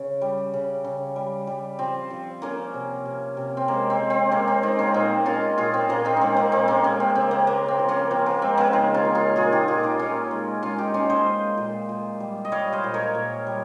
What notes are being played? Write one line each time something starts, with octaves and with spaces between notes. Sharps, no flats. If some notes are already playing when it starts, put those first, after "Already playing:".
Already playing: C#3
G3
C#3
C#3
G3
G3
F3 C4
F3
F3 A#3 C#4
C3
C3
C3
C4
G#3 A#3
C4
G#3
C4
G#3 A#3 C#4
C4
G#3 C4 D#4
A#3 C#4
A#2 C4 D#4
G#3 C#4 F4
A#2 F4 G#4
C4
A#2 A#3 C#4
C4 D#4
G#3 C4 C#4
A#3
A#2 C4
A#3 C#4
G#3 A#3 C#4
C4
C#3 C4
A#3
C#3 A#3
C4
F3
A#3 C#4
F3 C4
A#3
G#3 C4
A#3 C#4
C#3 C4 D#4
C#4 F4
F3
F4 G#4
A#2 F4 G#4
D#4 G4
A#2 F4 G#4
D#4 G4
A#2 C#4 F4
G#3
G#3 C#4 F4
D#4 G4
G#3 C#4 F4
C5 D#5
G#3
A#2
A#2
G3
D#5
G3 C#5 F5
C5 D#5
A#2
A#4 C#5
A#2
G3